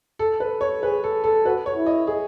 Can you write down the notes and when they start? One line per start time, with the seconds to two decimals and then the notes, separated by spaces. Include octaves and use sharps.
0.19 A4
0.40 B4
0.61 C#5
0.82 G#4 B4
1.04 A4
1.24 A4
1.45 F#4 B4
1.66 C#5
1.76 E4
1.86 D#5
2.07 G#4